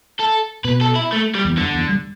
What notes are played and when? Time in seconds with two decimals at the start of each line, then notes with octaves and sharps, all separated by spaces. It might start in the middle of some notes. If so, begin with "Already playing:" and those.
0.19 A4
0.64 B2 B4
0.81 A4
0.95 E4
1.12 A3
1.35 G3
1.45 E2
1.57 G2 D3
1.74 E2
1.89 G3